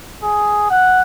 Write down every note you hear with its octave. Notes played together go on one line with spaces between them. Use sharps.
G#4
F#5